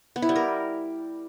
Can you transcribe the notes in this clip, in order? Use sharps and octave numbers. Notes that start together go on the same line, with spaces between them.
B3
E4
G3
A#4